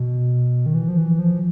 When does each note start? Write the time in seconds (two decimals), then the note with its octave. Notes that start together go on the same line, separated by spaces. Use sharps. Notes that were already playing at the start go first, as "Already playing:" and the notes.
Already playing: B2
0.66 D#3
0.75 E3
0.88 F3
0.97 E3
1.19 F3